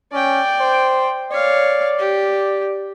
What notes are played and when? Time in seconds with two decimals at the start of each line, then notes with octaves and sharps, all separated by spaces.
0.12 C#4 D5 G5
0.60 C5
1.31 C#5 D5 F5
1.99 G4